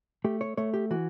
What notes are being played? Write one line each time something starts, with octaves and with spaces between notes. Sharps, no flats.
A3 G4
C#5
A3 C#5
G4
E3 F#4